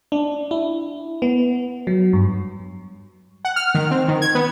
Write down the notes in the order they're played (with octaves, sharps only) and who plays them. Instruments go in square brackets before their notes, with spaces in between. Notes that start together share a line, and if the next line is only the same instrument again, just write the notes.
[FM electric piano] D4
E4
B3
F#3
G2
[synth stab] F#5
F6
D#3
C4
D#3
G#6
B3